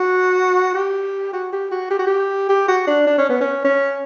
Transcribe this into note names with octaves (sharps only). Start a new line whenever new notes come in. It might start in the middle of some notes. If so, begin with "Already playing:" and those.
Already playing: F#4
G4
F#4
G4
F#4
G4
F#4
G4
G4
F#4
D4
D4
C#4
B3
C#4
C#4